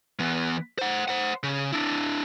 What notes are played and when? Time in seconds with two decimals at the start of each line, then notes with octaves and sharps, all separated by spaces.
0.19 E3 B3
0.79 C5 F#5
1.08 C5 F#5
1.43 C#3
1.72 D4 E4